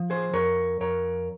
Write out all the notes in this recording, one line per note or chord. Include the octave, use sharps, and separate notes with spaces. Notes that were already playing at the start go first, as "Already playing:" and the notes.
Already playing: F3
G#4 C5
F2 A#4 C#5
F2 A#4 C#5